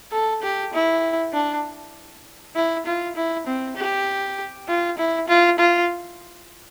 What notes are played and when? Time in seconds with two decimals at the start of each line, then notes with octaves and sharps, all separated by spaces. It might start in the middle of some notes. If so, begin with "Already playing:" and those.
0.12 A4
0.42 G4
0.73 E4
1.33 D4
2.56 E4
2.86 F4
3.16 E4
3.47 C4
3.76 G4
4.68 F4
4.98 E4
5.28 F4
5.59 F4